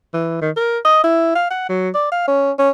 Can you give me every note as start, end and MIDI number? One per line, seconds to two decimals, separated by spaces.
0.13 0.37 52
0.41 0.50 51
0.57 0.79 70
0.85 1.02 75
1.04 1.33 64
1.35 1.49 77
1.50 1.67 78
1.69 1.89 54
1.94 2.08 74
2.12 2.24 77
2.28 2.52 61
2.59 2.70 61